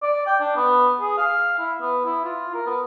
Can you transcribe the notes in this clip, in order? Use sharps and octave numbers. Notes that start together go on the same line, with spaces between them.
D5
G5
D4
B3
G#4
F5
E4
B3
E4
F4
A#4
B3